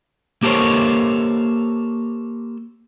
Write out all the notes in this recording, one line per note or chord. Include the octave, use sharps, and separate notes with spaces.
A#3 G4 A4 A#4 C5 C#5